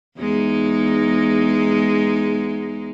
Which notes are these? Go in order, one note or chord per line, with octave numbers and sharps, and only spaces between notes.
E2 G#3 D#4